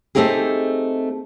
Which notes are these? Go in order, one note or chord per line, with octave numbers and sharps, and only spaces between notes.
A3 C4 D#4 G4 G#4